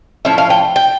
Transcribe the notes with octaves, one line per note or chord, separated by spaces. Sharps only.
A2 F3 C#4 E5
F5
G5
G5